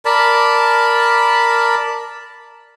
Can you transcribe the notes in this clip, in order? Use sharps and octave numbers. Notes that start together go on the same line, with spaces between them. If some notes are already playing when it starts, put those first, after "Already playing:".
A#4 D5 A5 B5